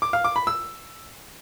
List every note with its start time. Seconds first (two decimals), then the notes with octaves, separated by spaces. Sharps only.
0.02 D6
0.13 F5
0.24 D6
0.36 B5
0.47 E6